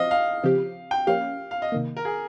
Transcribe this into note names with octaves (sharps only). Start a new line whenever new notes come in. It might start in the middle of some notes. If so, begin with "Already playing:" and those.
Already playing: F3 C4 D#5 F5
F5
C#3 F3 C4 G4
G5
F3 A#3 C#4 G4 F5
F5
D#5
C3 D#3 A#3
A#4
G#4